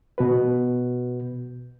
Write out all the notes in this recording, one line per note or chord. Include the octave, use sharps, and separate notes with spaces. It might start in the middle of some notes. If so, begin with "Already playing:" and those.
B2 F#4 B4